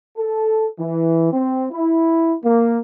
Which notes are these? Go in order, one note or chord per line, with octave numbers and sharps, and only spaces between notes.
A4
E3
C4
E4
A#3